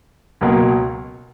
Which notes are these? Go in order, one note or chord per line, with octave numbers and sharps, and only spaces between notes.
C#2 B2 F#3 A#3